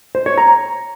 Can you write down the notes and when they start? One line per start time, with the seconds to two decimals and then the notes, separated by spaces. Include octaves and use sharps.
0.15 C5
0.26 C#5
0.38 A#5